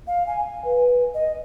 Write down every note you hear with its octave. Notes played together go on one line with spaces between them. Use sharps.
F5
G#5
B4
D#5